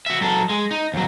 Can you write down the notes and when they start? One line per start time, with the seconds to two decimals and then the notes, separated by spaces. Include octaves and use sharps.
0.06 F#4 E5
0.22 F#3 A4
0.49 G#3
0.71 D#4
0.94 D#2 F#3